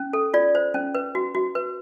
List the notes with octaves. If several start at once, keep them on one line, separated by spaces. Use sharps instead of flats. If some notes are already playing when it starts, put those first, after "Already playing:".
Already playing: C#4
A4
F4 D5
C5
C#4
B4
F#4
F#4
B4